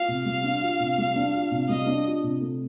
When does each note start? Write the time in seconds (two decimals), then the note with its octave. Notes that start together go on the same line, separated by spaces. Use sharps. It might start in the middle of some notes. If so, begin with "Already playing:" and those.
Already playing: F4 F5
0.08 C3
0.25 G3
0.44 D4
0.61 F4
0.80 C3
0.98 G3
1.16 D4
1.34 F4
1.51 C3
1.69 G3 D#5
1.86 D4
2.05 F4
2.23 C3
2.40 A3